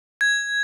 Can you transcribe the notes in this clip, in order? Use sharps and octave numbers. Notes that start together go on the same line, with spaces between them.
G#6